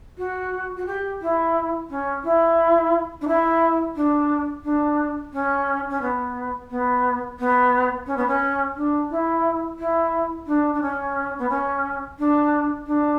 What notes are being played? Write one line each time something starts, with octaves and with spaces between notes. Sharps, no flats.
F#4
F#4
G4
E4
C#4
E4
D4
E4
D4
D4
C#4
C#4
B3
B3
B3
C#4
B3
C#4
D4
E4
E4
D4
D4
C#4
B3
C#4
D4
D4